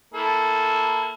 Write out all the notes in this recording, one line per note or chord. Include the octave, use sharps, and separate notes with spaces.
A#3 E4 A4